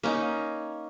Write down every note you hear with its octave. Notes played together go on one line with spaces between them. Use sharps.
A#3 C#4 D#4